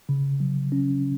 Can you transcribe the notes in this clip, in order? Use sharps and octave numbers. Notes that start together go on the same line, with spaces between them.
C#3
F#3
C#4